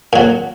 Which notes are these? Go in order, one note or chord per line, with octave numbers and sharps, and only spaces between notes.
A#2 F#3